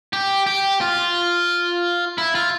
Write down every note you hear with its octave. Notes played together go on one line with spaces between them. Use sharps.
G4
G4
F4
E4
F4